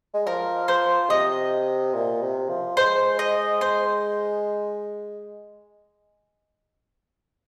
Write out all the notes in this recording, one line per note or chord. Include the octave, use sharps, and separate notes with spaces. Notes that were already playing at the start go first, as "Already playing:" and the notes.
G#3
F3 A#4
C5
C3 D#5
A#2
C3
F3
G#3 C5
D#5
C5